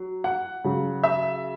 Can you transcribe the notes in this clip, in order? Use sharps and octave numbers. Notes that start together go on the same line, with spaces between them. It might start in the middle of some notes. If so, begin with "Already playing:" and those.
Already playing: F#3
F#5
C#3 F#3
E5